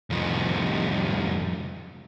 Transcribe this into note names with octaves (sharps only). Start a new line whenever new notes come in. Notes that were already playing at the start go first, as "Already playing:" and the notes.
C2 F2